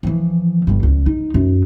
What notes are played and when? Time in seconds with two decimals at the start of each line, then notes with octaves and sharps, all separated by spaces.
0.03 E3 F3
0.67 G1 G2
0.83 C#2
1.06 D#4
1.34 F#2